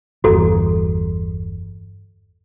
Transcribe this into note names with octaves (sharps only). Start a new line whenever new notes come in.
G1 E2 F#4 A4 A#5